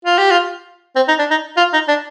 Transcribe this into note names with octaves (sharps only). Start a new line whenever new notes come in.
F4
G4
F4
C4
D#4
D4
D#4
F4
D#4
D4